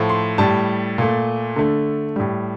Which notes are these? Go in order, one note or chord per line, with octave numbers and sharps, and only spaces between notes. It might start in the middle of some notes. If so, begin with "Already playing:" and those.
Already playing: A2 F3 A3
C6
A2 G3 A5
A#2 A3
D3 A3
A2 G3